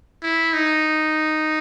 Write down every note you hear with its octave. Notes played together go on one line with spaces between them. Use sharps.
E4
D#4